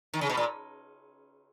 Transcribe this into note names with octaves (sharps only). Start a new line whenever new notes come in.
D#3
C#3
B2
A#2